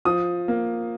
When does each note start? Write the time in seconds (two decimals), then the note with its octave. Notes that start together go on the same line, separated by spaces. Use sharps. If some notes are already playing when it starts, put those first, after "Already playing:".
0.05 F3 D#6
0.48 A#3